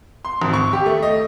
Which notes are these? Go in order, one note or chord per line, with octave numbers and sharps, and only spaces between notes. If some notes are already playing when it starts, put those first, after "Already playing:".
C6
G#1
C#6
G4
A3
D#5